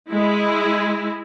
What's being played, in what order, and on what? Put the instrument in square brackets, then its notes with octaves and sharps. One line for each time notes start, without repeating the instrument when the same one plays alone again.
[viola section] G#3 E4